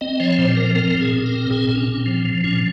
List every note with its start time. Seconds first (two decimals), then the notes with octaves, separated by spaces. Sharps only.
0.01 C4 D#5
0.20 F3 C#5
0.38 A#2 C5
0.57 F3 A#4
0.75 C4 A#4
0.95 A#2
1.01 G#4
1.13 A#2
1.26 A#4
1.31 C4
1.50 A#2 G#4
1.69 A#2
1.76 C#4
1.88 A#2
2.00 C4
2.06 F3
2.24 F3
2.44 A#2 C#4